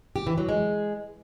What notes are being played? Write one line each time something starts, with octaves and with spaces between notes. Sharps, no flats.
G4
E3
F#3
G#3